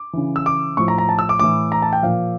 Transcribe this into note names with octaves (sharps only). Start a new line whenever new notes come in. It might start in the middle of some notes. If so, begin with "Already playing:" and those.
Already playing: D6
C#3 E3
E6
D6
A2 F3 C#6
A#5
A#5
A5
E6
D6
A2 E3 D6
A#5
A5
G5
A#2 F3 F5